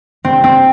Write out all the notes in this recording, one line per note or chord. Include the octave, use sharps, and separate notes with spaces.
C4
C4